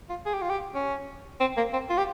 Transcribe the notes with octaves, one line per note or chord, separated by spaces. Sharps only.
F4
G#4
G4
F4
G4
C#4
C4
A#3
C4
F4
G4